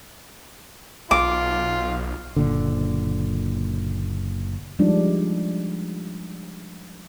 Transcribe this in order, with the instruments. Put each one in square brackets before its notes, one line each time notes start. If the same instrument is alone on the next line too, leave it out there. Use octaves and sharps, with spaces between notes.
[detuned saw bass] B1 [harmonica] F4 [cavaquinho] D6
[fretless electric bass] F#1 A#2 D3
[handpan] F3 G3 G#3 D4 D#4